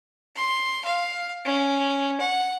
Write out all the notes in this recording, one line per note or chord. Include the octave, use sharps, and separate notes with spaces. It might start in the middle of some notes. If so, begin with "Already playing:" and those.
C6
F5
C#4
F#5